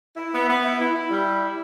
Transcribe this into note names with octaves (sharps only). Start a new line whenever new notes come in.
E4
B3
B3
E4
E4
E4
G3
E4
E4